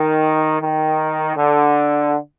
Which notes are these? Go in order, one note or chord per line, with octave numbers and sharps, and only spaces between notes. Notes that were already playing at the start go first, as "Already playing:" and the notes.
Already playing: D#3
D#3
D3